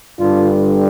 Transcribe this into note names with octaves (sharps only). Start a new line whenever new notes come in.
G2 D3 G3 D4 F4